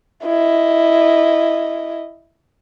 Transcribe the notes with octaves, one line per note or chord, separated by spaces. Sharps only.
E4 D#5